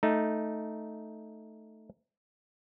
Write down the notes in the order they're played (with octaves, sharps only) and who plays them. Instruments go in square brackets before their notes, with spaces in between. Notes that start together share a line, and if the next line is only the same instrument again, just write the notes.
[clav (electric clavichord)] A3 D#4